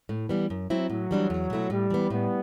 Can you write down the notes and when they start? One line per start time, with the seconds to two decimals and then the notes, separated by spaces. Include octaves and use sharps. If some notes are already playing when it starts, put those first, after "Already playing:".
0.09 A2
0.29 E3 G3 B3
0.50 F#2
0.70 F#3 C4 E4
0.90 A2 F#3
1.11 E3 G3 D4
1.30 E2
1.50 B2 A3 E4
1.70 A2 G3
1.90 E3 B3
2.10 A2 G3 B3